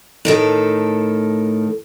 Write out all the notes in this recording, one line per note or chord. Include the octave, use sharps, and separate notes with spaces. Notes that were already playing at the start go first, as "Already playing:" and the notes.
A2 D#3 A4